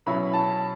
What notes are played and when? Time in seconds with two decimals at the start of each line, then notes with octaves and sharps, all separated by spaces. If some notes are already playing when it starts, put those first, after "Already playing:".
0.06 B2 F#3 C#4 E4 B5
0.33 A5